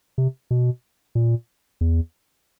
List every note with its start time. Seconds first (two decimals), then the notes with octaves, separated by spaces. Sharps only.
0.18 C3
0.51 B2
1.15 A#2
1.81 E2